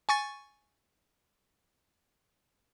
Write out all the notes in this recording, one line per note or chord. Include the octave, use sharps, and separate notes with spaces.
G#5 C#6 A6